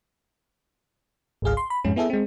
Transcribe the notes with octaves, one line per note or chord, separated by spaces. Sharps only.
G#1 C#2 G#4 F5
C6
B5
F2 G#2 G#3 C#4
B3 E4 G#4 A4 E5
G#3 C4